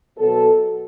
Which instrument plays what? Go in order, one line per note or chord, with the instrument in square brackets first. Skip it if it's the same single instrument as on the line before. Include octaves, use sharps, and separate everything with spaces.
[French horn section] B2 F#3 B3 A4